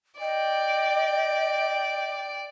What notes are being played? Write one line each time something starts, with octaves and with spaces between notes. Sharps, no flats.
D5 D#5 G5